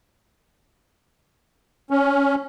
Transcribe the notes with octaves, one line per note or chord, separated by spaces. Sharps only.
C#4